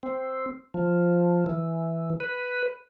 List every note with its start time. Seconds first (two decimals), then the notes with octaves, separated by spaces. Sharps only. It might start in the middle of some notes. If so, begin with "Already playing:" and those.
0.03 C4
0.74 F3
1.46 E3
2.20 B4